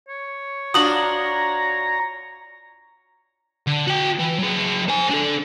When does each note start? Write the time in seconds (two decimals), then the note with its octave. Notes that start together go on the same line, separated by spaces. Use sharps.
0.09 C#5
0.74 D4 F4 F#4 A#5 D#6 F#7
3.67 D3
3.87 F#4 G5
4.19 E3
4.39 F#3 G#4
4.89 C5 G#5
5.10 D4 A4